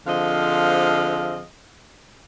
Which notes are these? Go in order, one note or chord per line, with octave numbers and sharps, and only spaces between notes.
D3 F3 C4 G#4 D#5 F5